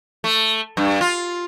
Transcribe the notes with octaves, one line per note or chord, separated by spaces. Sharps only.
A3
G2
F4